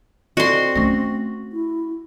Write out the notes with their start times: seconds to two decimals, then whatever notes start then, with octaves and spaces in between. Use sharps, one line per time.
0.37 C4 F#4 A4 D5 D#5 C6
0.76 A3 C#4 C#6 A#6
1.53 E4